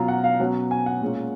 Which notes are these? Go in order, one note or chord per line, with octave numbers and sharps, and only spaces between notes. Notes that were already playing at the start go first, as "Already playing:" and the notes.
Already playing: B2 F#3 C#4 F4 A#5
F#5
F5
B2 F#3 C#4 F#5
G#5
F#5
A#2 G#3 C#4 F4